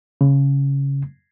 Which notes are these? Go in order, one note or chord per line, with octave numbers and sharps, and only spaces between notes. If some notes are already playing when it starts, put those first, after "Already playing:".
C#3